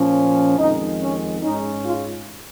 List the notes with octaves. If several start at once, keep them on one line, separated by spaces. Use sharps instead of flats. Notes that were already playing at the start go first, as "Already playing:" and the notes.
Already playing: A#2 F3 C#4
F2 D#3 G#3 D#4
C#4
G#2 G#3 C#4 D#4
F4